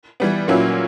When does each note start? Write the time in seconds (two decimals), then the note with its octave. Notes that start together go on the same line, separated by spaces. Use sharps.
0.20 E3 G3 B3
0.48 A#2 F#3 A#3 C#4 E4